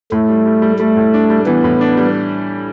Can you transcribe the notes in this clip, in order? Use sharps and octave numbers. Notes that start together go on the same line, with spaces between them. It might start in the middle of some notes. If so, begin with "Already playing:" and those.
A2 A3
G3
G3
G3
G3 A3
A2
D4
G3
E3 B3
A2
D4
G3